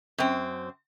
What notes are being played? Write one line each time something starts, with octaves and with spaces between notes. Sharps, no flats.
F#2 C4